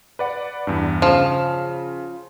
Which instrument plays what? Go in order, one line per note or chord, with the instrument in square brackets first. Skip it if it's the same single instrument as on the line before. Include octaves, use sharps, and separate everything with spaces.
[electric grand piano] B4 D5 F#5
E2 G2
[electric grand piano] C#3 F6 E7 [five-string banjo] F3